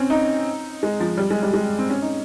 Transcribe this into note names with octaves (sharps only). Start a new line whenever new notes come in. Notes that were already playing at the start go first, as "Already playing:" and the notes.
Already playing: C4 C#4
D#4
G#3
F3
G3
G#3
G3
G#3
C4
C#4
D#4